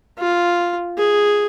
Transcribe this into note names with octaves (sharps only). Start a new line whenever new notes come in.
F4
G#4